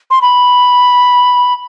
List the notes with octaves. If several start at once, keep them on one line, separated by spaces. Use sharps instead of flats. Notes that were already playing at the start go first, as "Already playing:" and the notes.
C6
B5